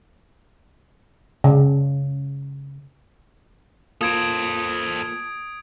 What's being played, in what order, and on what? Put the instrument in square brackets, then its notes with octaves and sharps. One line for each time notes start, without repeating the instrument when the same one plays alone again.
[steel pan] C#3
[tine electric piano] A#3 F4 [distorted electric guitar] A4 C5 [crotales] D#6 G#6 D7